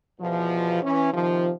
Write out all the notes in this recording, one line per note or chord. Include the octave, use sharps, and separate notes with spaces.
E2 B2 F3
E3 C#4
C3 D#3 F3